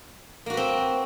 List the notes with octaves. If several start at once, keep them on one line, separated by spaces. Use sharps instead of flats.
A#3 C4 F#4 B4